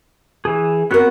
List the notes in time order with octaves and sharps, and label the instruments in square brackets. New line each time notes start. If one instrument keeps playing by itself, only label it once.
[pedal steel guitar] E3 G#4
[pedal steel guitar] B3 F#4 C#5 [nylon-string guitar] C4 A#4